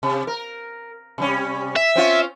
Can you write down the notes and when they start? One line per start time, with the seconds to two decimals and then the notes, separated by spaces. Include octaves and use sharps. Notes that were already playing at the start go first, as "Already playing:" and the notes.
0.03 C3
0.27 A#4
1.18 C3 G3 C#4
1.76 E5
1.96 C4 C#4 F4